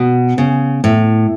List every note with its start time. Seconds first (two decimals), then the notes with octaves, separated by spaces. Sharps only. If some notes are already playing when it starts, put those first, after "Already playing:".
Already playing: B2
0.38 C#3
0.84 A2